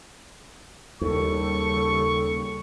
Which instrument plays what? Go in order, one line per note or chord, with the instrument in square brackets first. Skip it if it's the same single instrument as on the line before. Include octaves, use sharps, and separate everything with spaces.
[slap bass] D#2 [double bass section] C#3 G3 [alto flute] A4 [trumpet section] C#6